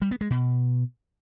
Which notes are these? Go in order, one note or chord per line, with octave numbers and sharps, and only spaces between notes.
G3
B3
G#3
B2